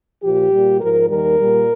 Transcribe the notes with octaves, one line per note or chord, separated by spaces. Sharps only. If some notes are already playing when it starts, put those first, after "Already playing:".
A#2 F3 G4
A#2 G3
G#2 F3 A#4
D#2 D#3 G3 A#4
A#2 G3